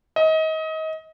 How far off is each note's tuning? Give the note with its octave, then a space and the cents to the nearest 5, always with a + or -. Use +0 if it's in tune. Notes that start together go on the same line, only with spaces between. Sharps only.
D#5 +30